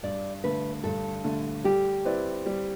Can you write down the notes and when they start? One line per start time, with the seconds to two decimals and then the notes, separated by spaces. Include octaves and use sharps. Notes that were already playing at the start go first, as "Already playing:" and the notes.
0.03 G2 D5
0.44 D3 A3 B4
0.84 G2 A4
1.24 D3 A3
1.64 G3 G4
2.05 C4 E4 B4 D5
2.46 G3